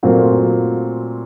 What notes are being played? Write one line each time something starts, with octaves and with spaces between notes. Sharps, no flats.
A#2 F#3 A3 C4 F4